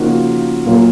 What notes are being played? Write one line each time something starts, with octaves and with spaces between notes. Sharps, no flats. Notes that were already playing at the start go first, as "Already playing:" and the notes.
Already playing: C#3 F3 A#3 D#4 F#4
A#2 F#3 A#3 F4